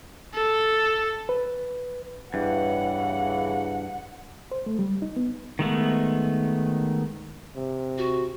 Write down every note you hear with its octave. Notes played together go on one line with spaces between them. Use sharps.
A4
B4
G2 C#3 E3 F#5
C5
A3
G3
D#4
B3
D#3 G#3 A3 B3
C3
F#4